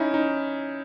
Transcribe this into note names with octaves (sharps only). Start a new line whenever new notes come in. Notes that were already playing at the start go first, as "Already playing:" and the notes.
Already playing: C#4 D#4 E4
D#4